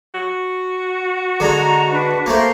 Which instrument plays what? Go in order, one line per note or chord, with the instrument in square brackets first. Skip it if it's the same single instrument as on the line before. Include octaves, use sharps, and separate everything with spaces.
[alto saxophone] F#4
[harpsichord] D3 G#3 [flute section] A#5
[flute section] D4 B4
[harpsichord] A3 A#3 [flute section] A#4 C5